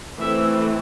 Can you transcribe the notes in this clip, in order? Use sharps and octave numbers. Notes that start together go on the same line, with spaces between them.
E3 A3 C4 E5